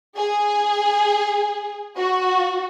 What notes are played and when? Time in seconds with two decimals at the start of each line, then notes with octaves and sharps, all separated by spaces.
0.19 G#4
1.98 F#4